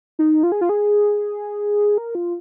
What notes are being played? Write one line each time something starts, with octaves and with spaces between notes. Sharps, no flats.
D#4
F4
G#4
F4
G#4
A#4
F4